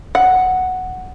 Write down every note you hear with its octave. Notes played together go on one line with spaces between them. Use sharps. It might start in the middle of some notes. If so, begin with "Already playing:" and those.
F#5